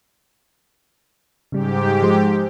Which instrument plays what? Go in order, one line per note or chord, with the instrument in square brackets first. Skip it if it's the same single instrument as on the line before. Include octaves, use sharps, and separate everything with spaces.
[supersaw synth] G#2 G4 [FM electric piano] C#3 G3
[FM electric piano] F3 G#3 C5